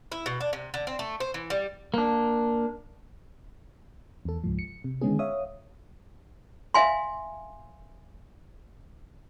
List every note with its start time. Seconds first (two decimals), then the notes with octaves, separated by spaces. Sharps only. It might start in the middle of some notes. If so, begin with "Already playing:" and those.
0.12 E4
0.26 B2
0.41 D4
0.53 C3
0.74 D3
0.87 C4
0.99 A3
1.20 C5
1.34 E3
1.50 G3
1.94 A#3 D4
4.25 E2 A4
4.44 C#2 G#2 F3
4.59 C#7
4.84 C3
5.01 D3 D#3 G#3 B3 C#4 G#4
5.19 C#5 E5 F5 D#6
6.74 E5 F5 G#5 C6